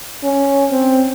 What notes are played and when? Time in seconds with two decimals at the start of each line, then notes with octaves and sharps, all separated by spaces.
0.24 C#4
0.71 C4